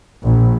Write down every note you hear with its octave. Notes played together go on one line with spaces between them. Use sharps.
A#1